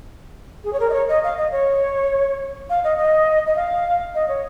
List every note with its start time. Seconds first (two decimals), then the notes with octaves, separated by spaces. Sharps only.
0.64 G#4
0.72 C#5
0.80 A#4
0.89 D#5
0.93 C#5
1.08 D#5
1.23 F5
1.37 D#5
1.51 C#5
2.69 F5
2.84 D#5
2.98 D#5
3.46 D#5
3.56 F5
4.14 D#5
4.28 C#5